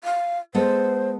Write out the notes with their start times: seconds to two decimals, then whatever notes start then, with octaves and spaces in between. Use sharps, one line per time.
0.04 F5
0.55 G#3 B3 A4 C5